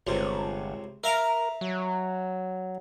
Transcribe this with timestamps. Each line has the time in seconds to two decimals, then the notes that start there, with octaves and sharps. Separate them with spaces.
0.07 G1 C#2 C3
1.04 A#4 E5 F5 A#5
1.61 F#3